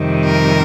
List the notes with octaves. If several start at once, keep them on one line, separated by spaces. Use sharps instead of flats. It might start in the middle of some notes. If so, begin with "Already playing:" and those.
Already playing: F2 C3 D#3 G3
A#4